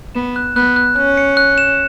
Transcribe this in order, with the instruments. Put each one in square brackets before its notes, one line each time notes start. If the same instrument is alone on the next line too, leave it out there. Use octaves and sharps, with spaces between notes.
[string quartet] B3 [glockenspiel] E7
[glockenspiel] F#6
[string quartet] B3 [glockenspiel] F#6
[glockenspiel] F#6
[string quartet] C#4 [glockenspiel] F#6
[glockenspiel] C#7
F#6
E7